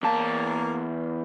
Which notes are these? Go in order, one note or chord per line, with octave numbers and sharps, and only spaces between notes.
E2 A#3 A5